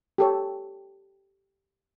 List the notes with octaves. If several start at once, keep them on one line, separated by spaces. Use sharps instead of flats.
G4 A4 C#5